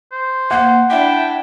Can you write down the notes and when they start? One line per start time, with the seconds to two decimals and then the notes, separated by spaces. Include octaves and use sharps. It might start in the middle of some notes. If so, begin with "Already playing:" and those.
0.12 C5
0.51 A#3 F#5
0.90 D4 E4 E5 G5